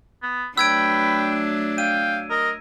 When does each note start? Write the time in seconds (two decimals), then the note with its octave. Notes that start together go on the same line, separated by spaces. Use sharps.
0.22 B3
0.58 F#3 A3 D4 B4 G5 E6 G#6 D7
1.78 F5 G5 D#7
2.30 A#4 D#5